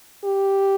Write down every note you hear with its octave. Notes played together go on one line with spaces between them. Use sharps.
G4